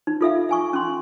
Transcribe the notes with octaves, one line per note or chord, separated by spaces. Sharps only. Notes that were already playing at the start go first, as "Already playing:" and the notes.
D#4
F4 A4 E5 F5
F5 G#5 C#6
C#4 C6